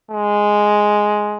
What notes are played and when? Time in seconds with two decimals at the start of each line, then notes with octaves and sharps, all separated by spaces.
0.11 G#3